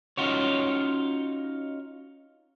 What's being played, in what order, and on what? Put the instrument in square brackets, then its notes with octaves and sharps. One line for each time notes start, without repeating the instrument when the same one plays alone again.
[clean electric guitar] C#4 D#4 F4 F#4 C#5